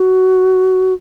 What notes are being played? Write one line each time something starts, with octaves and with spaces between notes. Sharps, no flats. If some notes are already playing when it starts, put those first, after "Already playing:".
Already playing: F#4